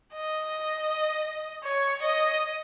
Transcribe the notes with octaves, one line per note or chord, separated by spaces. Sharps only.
D#5
C#5
D#5